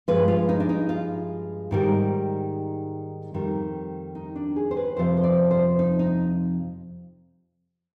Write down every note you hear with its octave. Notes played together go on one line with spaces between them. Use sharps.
G2 F3 G#3 B4
F4
D#4
D4
D#4
F4
G#2 D#3 G3
F2 D#3 G3
D#4
D4
G#4
C5
B4
F2 C3 F3 C5
C5
D5
C5
D#4
D#4